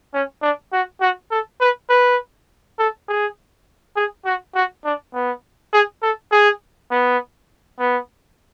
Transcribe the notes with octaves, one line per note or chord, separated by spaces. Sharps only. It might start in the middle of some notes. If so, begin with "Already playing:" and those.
C#4
D4
F#4
F#4
A4
B4
B4
A4
G#4
G#4
F#4
F#4
D4
B3
G#4
A4
G#4
B3
B3